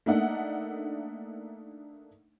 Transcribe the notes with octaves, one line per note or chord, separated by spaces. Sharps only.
A3 A#3 D4 D#4 E5 F#5